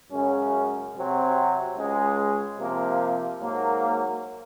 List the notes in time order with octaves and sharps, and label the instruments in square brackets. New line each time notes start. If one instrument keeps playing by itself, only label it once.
[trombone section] F#2 C#3 G#3 C#4
C3 F#3 C4
C#2 C#3 G#3
C3 F3 A#3
G#2 F#3 A#3